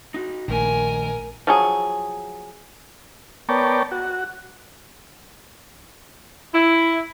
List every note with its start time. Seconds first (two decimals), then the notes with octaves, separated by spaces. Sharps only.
0.14 D#4 F#4
0.48 A#1 D#3 A3 A#4 G#5
1.47 F3 F#3 G#4
3.49 B3 A#4 C#5 D5 G5 A5
3.91 F#4
6.54 E4